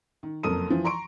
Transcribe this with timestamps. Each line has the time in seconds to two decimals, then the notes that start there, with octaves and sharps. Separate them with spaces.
0.23 D#3
0.43 F#1 F2 A4 A#4 D#6 D#7
0.70 E3 F3
0.85 A#5 C6 C#6 D7